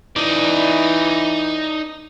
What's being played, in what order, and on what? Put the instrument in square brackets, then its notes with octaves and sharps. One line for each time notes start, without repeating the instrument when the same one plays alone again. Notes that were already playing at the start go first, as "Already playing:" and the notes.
[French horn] E3 [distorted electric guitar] D#4 D5